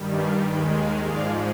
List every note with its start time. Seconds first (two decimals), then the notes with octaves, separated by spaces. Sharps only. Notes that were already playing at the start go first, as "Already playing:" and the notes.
Already playing: G2 D#3 G3
0.16 F5 G#5
0.45 D#2 D#3 G#3 G5 B5
0.75 F5 G#5
1.04 G#2 F3 G#3 D5 F5